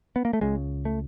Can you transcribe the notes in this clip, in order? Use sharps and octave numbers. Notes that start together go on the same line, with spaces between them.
B3
A#3
A3
C#2 C#3 G#3
A3